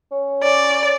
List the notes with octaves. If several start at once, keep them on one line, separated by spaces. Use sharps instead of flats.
C#4
C#4 D5